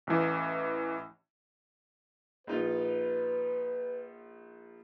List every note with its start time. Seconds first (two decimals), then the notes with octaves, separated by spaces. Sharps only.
0.07 A1 E3
2.47 A#1 D#4 F4 B4